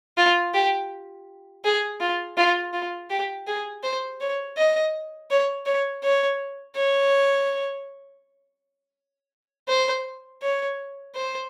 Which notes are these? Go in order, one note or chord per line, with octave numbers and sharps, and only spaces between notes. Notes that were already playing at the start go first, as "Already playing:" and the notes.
F4
G4
G#4
F4
F4
F4
G4
G#4
C5
C#5
D#5
C#5
C#5
C#5
C#5
C5
C#5
C5